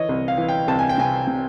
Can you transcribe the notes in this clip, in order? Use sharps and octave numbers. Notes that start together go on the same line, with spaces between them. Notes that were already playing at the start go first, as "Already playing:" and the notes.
Already playing: E3 C#5 D#5
C2
F5
E3
G5
C2 A5
G#5
G5
C3 G#5
C3